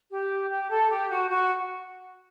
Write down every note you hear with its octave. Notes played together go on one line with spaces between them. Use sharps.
G4
G4
A4
G4
F#4
F#4